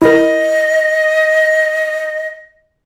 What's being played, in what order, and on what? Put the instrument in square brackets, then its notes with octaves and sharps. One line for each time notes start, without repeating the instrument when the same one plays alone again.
[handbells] E4 A#4 [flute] D#5